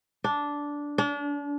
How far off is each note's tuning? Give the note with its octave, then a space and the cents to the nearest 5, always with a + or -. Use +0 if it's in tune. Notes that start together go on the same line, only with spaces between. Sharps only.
D4 -10
D4 -35